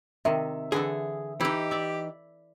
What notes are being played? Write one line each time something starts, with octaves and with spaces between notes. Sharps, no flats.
C3 D#3 E5
D3 E3 G#4 A4
E3 D#4 E4 G4
D5 E5